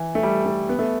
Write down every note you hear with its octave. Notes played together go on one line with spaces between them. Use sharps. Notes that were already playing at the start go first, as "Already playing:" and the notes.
Already playing: E3
A3
G3
A3
B3
A3